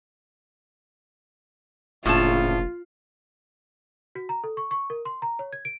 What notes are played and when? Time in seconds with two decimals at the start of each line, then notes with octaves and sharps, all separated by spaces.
2.06 F1 A#1 A2 C#3 F4 A5
4.15 F#4
4.29 A#5
4.44 A4
4.57 C#6
4.71 C#6
4.90 A#4
5.05 C6
5.22 A#5
5.39 C#5
5.53 G#6
5.65 D7